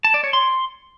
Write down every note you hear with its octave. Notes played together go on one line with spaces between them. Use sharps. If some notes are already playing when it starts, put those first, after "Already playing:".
A5
D5
C#5
C6